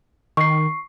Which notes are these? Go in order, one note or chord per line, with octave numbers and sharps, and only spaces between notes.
D#3 C#6 C7